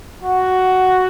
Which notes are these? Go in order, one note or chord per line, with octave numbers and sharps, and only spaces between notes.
F#4